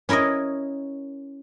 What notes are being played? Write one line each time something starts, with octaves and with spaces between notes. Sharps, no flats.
C#4 E4 A#4 C#5 D#5